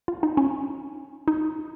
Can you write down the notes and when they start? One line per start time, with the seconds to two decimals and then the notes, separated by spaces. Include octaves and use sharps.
0.08 F4
0.23 D#4
0.37 C#4
1.28 D#4